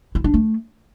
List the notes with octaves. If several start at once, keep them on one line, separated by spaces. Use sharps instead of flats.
E4
D4
A3